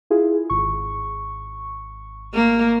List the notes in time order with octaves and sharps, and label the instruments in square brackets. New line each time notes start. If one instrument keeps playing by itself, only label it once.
[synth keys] E4 F4 G#4
G#1 C#6
[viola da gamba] A#3